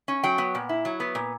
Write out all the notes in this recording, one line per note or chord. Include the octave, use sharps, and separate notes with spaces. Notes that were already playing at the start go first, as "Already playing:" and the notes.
C#4
F#3 G5
B3
A#2
E4
F#3
B3
A#2